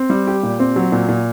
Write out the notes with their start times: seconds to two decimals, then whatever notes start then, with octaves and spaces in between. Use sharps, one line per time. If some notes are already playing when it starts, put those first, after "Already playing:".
Already playing: C4
0.10 G3
0.27 G4
0.43 A#2
0.60 C4
0.76 F#3
0.92 A#2
1.08 A#2